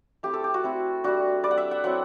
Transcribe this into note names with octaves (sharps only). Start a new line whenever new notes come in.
A3 C4 E4 G4
A4
G4
F#4
A3 C4 E4
G3 D4 F#4
G3 D4 D5
F#5
E5
F#5
F#3 C4 E4 F#5